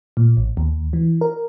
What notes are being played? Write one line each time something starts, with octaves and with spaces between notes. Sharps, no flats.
A#2
A1
D#2
E3
A#4